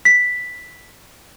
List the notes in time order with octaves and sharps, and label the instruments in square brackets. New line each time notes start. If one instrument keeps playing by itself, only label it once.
[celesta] B6